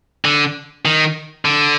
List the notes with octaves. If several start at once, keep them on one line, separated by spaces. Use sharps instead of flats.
D3
D#3
D3